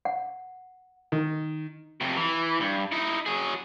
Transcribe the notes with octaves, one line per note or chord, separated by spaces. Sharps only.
F#5
D#3
F2 C3
E3
G2
D#4 E4
F#3 G#4